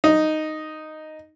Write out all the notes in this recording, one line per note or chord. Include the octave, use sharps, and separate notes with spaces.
D#4